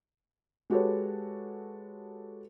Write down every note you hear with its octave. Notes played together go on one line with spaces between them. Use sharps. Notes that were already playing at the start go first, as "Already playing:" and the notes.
G#3 F#4 G4 A4 B4 C#5